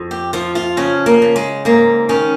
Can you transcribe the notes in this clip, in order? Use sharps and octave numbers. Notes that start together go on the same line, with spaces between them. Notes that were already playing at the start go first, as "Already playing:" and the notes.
Already playing: F2
G4
F3 F4
F4
C#3 C#4
A#3
C#3
G#3
G#2 A#3
D#3 C#4